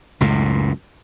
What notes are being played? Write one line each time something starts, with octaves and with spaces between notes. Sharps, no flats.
C#2 F#2 A2